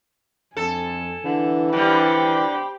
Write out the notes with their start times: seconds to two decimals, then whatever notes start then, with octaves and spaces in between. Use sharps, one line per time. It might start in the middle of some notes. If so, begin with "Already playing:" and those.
0.57 F2 A4 G#5
1.25 D3 E3
1.73 D3 G3 G4 C5 B5